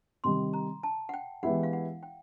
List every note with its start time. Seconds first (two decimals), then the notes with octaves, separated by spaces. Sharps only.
0.24 C3 D#3 G3 C6
0.53 A#5
0.83 A5
1.09 F#5
1.14 G5
1.43 E3 G#3 B3 E4 G4 F#5
1.63 F5
1.73 F#5
2.03 G5